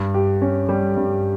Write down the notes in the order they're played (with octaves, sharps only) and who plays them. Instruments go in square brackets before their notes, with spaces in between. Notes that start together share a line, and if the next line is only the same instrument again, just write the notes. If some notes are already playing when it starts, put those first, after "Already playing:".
Already playing: [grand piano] G2
G4
C#4
G3
G2